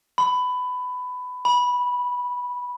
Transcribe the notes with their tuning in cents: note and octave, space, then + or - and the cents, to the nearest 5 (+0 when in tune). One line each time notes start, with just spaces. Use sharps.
B5 +20
B5 -10